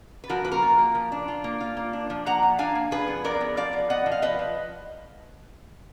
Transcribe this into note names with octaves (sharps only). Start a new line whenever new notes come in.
B4
F3 F#4 A#4
A#3 B4
F#4 A#4
F4
A#3
F3
D4
F4
A#3
F4
A#3
D4
F3
A#3 F#5 A#5
F3
D4 F5 G#5
A#3
F3 G#4 B4
B3
B3 A#4 D5
B3
F3 D5 F5
B3
B3 D#5 F#5
F3
F5
F3 B4 D#5
F3